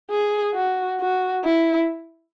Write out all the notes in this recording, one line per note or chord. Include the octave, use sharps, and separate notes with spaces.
G#4
F#4
F#4
E4